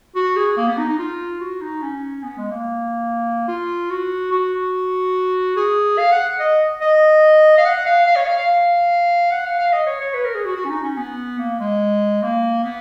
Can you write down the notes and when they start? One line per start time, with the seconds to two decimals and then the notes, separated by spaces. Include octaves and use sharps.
0.15 F#4
0.36 G#4
0.57 A#3
0.67 B3
0.78 D#4
0.89 D#4
0.99 F4
1.41 F#4
1.61 D#4
1.82 C#4
2.23 B3
2.38 G#3
2.51 A#3
3.48 F4
3.90 F#4
4.32 F#4
5.57 G#4
5.98 F5
6.12 F#5
6.40 D#5
6.81 D#5
7.58 F5
7.65 F#5
7.86 F5
8.07 F5
8.16 C#5
8.27 F5
8.37 F5
9.31 F#5
9.45 F5
9.59 F5
9.73 D#5
9.87 C#5
10.01 C#5
10.14 B4
10.25 A#4
10.35 G#4
10.45 F#4
10.56 F#4
10.65 C#4
10.70 D#4
10.83 C#4
10.97 B3
11.39 A#3
11.60 G#3
12.23 A#3
12.64 B3